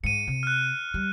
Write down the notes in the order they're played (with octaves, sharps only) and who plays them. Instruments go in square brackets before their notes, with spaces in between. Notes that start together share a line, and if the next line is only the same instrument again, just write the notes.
[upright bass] G#2 [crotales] C#7 D#7
[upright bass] C3
[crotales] F6 F#6
[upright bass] G3